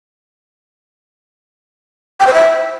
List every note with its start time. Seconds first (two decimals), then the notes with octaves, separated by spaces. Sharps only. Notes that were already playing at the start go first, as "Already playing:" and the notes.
2.20 G5
2.27 C5
2.33 E5